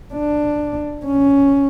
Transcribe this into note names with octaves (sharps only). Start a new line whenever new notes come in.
D4
C#4